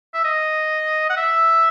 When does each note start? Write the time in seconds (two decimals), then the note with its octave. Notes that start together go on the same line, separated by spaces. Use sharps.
0.14 E5
0.25 D#5
1.10 F#5
1.17 E5